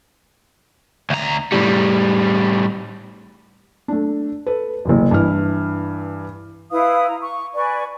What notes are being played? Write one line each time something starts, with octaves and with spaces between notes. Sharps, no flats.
D2 A#5
A2 G3
A3 D4
A4 B4
F#1 C2 F#2
G2 E3 E4 F6
E4 B4 F5 D#6
A#5
C#6
B4 D5 G#5 C#6